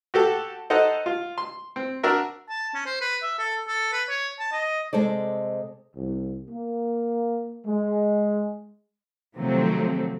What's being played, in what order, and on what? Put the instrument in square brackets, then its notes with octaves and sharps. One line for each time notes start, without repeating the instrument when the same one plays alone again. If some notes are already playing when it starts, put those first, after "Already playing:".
[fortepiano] F#4 G4 A4
D#4 A4 C5 F#5
F4
C6
C4
D4 F#4 A#4 E5
[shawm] A5
C#4
C5
B4
E5
A4
A4
B4
C#5
A5
D#5
[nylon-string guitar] C3 G#3 A4 C5 D5
[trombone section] C2
A#3
G#3
[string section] C3 D#3 F3 F#3 A3 C4